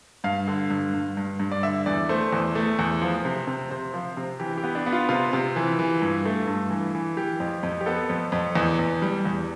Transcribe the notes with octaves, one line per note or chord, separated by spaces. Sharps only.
G2 F5
D3
G2
G2
G2
G2
D5
D3 E5
E2 D5
A3 C5
E2
A3
E2
F3
C3
C3
C3 C5
F3
C3
E3 G4
G4
B3
D4
B3
F4
C3 F4
C3
E3
E3
G2
A3
G2
E3
E3
E3 G4
F2
F2
G4
B3 A4
F2
F2
E2
E2
G3
E2